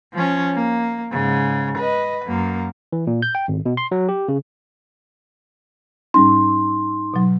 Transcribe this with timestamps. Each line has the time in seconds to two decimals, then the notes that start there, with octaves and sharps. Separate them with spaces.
0.14 F3 C#4
0.54 A#3
1.12 G#2 C#3
1.78 B4 D#5
2.26 F#2 A#3
2.93 E3
3.07 A#2
3.22 G6
3.35 G5
3.48 G#1
3.66 B2
3.77 C6
3.92 F#3
4.09 G4
4.28 C#3
6.14 G#2 G3 C#4 D#4 C6
7.14 B2 F#3